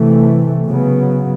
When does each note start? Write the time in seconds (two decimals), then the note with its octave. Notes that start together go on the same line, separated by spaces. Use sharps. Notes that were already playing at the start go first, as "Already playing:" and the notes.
Already playing: C3 E3 A3
0.67 C#3 F#3 B3